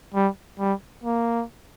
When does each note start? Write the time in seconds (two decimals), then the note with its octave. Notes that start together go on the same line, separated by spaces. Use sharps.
0.14 G3
0.60 G3
1.04 A#3